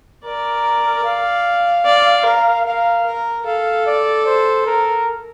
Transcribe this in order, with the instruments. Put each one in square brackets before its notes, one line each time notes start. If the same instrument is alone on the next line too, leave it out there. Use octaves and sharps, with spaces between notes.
[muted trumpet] A#4 [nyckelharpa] D5
[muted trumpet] F5
[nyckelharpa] D5
A#4
[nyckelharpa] A#4 [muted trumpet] F5
[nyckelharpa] A#4
[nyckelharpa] A4 [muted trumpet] F5
[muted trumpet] D5
C5
A#4